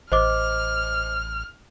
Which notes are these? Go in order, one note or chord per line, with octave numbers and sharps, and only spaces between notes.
A1 C5 D#5 D6 F6